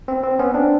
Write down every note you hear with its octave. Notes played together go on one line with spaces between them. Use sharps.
C4
C4
B3 C#4
C4 D4